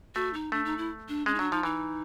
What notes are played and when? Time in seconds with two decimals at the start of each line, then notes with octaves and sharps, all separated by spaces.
0.15 A3 F#4
0.34 D#4
0.52 A3 D4
0.65 D#4
0.78 E4
1.08 D4
1.26 G#3 C#4
1.35 D#4
1.39 F#3 D4
1.52 F3 D#4
1.63 E3 D#4